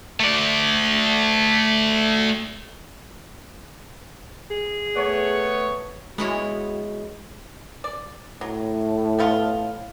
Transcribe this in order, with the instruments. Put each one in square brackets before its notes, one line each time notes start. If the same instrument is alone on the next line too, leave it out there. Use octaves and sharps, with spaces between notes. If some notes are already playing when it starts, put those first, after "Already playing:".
[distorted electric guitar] A3 D5
[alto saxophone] G#4
[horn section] A3 B3 C#5
[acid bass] G#3 [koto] B3 E4 C#5 [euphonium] F#4
[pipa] D5
[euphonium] A2 [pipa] F#3
[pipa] F3 B3 F4